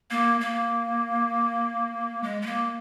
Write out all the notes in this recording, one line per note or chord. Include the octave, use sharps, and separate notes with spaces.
A#3
A#3
G#3
G#3
A#3